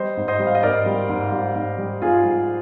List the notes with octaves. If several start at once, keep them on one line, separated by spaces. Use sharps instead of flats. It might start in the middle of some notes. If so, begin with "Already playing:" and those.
Already playing: G3 C5 D#5
G#2
C5 D#5
G3
F5
D#5
G#2 A#4 D5
G3
G#2
G3
G#2
G3
G#2 F4 G#4
G3